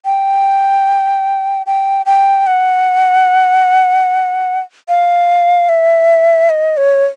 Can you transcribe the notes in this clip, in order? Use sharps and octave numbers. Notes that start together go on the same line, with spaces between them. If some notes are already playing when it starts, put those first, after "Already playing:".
G5
G5
G5
F#5
F5
E5
D#5
C#5